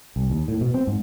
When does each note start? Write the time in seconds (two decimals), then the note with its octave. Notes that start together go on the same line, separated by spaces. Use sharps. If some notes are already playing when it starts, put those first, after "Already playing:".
0.16 C2
0.30 D#2
0.48 A2
0.61 B2
0.74 C4
0.87 G#2